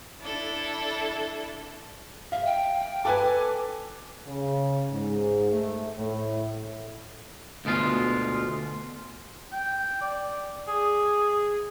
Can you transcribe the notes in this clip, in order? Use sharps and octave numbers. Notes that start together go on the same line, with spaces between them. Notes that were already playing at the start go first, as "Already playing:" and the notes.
D4 E4 A4
E5 F5
G5
A4 B4 G#5 D6
C#3
G#2
A3
A2
D2 B2 G#3 F4
G5
D5
G#4